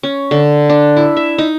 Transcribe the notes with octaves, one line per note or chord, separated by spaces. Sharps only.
C#4
D3
D4
E4
E5
D#4